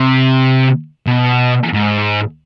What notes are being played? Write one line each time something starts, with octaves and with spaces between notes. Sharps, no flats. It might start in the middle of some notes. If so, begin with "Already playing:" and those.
Already playing: C3
B2
G#2